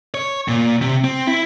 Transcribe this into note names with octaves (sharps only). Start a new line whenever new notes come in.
C#5
A#2
C3
C4
E4